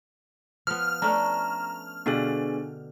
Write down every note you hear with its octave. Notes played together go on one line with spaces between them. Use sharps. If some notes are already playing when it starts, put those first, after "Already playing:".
F3 B3 F6
A3 C#4 D4 A#5
B2 D3 B3 D4 G4 G#4